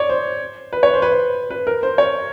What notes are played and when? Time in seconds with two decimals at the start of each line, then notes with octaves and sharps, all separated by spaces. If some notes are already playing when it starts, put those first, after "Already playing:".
Already playing: C#5 D5
0.09 C5
0.73 B4
0.83 C#5
0.94 C5
1.02 B4
1.12 C5
1.50 B4
1.67 A#4
1.83 C5
1.98 C#5